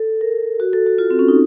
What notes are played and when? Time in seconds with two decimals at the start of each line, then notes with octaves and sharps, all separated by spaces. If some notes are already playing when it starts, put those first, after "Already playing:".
Already playing: A4
0.21 A#4
0.60 F#4
0.73 A4
0.87 F#4
0.98 F4
1.10 C4
1.19 C#4
1.28 D#4